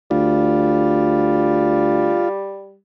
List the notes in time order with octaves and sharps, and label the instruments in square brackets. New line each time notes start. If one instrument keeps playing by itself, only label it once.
[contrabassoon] D2 [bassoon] G3 [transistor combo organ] F4